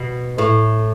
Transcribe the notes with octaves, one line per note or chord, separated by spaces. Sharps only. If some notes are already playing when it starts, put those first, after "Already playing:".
Already playing: B2
A2